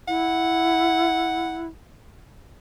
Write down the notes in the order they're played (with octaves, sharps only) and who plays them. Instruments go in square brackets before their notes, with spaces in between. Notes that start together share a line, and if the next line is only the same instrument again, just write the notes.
[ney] E4 [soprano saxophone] F#5